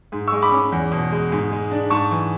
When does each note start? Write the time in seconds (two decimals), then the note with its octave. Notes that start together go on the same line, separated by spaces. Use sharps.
0.12 G#2
0.27 G#3 C#6 E6
0.42 B5 D6
0.52 C#4
0.72 E2
0.91 B2
1.12 G#3
1.32 G#2
1.51 G#3
1.71 D4
1.90 G#2 A5 C#6
2.11 E3